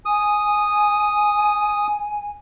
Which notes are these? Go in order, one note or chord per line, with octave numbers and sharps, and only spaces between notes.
G#5 D#6